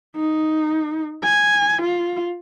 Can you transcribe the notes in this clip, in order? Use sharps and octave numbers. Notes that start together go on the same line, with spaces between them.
D#4
G#5
F4